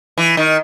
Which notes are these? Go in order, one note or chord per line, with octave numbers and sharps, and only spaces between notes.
E3
D#3